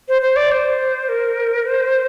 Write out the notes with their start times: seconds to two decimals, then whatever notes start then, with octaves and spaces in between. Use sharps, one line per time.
0.09 C5
0.22 C5
0.36 D5
0.51 C5
1.09 A#4
1.66 C5